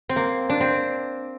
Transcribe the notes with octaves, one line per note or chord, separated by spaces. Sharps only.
C4
A#3
D4
C4